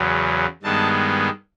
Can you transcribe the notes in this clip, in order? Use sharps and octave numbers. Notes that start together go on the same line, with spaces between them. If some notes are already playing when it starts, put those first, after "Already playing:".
Already playing: E2 C#3 F#3
G2 D#3 G#3 B3 A5